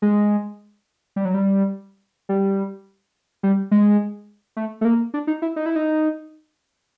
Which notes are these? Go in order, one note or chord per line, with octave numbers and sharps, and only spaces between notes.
G#3
G3
F#3
G3
G3
G3
G#3
A3
A3
A#3
D4
D#4
E4
D#4
E4
D#4